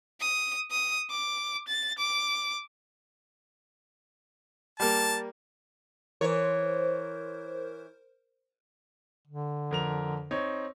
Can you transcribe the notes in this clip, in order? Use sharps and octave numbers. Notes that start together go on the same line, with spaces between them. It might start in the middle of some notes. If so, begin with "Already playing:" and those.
D#6
D#6
D6
A6
D6
G3 A#3 A5
E3 A#4 C5 C#5
D3
F2 A#4 F7
C4 D#4 C#5